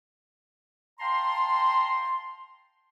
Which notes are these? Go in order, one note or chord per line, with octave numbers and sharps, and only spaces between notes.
F5 G5 A5 A#5 C6